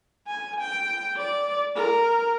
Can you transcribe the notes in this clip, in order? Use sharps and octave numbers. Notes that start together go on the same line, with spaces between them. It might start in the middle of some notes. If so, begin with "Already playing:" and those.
G#5
G5
D5
A#4